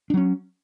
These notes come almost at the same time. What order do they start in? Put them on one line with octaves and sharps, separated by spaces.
D4 F#3 C#4